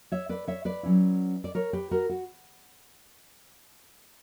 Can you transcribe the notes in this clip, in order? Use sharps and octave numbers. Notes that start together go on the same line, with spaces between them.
C#5 E5
B4 D5
C#5 E5
B4 D5
F#3 C#4 E4
D5
A#4 C#5
G4 B4
F#4 A#4
F#4